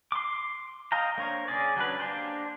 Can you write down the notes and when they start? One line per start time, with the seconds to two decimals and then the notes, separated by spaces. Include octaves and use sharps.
0.12 C6 D6
0.92 D#5 F5 G5 A#5
1.18 A#3 D4 A#4 C5 C#5
1.48 C#3 C#4 G#4 D5
1.77 F#3 C#4 D4 B4
2.00 A#3 D4 G4 C5